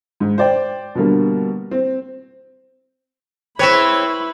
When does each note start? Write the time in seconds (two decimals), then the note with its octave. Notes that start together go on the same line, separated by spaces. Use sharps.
0.20 G#2
0.38 C5 D5 G5
0.95 B2 D3 G3 A#3
1.71 C4
3.59 C4 E4 B4 C#5 E5 B5